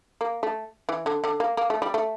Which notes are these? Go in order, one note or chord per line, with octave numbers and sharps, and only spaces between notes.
A#3
A3
E3
D3
D3
A#3
A#3
A3
G3
A3